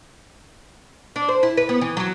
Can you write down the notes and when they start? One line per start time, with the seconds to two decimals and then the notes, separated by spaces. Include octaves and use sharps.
1.16 D4
1.29 C5
1.43 E4
1.57 B4
1.69 B3
1.81 E3
1.97 F#3